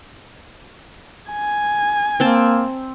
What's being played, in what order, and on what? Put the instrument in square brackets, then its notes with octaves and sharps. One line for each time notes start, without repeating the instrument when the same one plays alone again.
[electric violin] G#5
[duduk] A#3 [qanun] C4 G5 A5